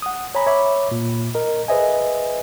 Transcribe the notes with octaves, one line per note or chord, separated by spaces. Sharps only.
F#5 D#6
C#5 G#5 A#5 B5
C#5 E5 B5 D6
A#2
A#4 D#5
G#4 B4 C5 D#5 E5 G#5